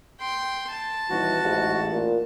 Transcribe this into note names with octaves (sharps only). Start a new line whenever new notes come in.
G5 C6
A5
D#1 E3 F#4
A1 G#2
A#2